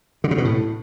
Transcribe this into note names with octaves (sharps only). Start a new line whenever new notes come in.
D3
C#3
B2
A2